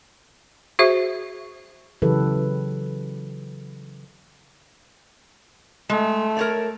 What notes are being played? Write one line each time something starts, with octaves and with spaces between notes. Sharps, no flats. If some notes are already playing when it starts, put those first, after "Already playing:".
F#4 G#4 C5 E5
C#3 E3 F#3 G4 A4 B4
G#3 A3
A#4 C#5 D5